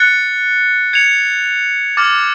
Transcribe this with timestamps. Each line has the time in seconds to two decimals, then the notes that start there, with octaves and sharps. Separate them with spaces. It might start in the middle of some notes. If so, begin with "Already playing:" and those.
Already playing: F#6 A6 C#7
0.93 G#6 C#7 F7
1.97 D6 F6 A6